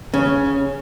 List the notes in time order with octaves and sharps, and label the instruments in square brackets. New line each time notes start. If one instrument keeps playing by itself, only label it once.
[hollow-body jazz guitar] C#3 [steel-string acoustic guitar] C#4